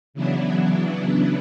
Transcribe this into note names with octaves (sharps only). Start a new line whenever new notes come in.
C#3 E3 F#3 B3 D4 E4